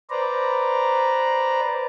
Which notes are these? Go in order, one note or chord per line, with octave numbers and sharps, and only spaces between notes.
B4 C5 D5 A#5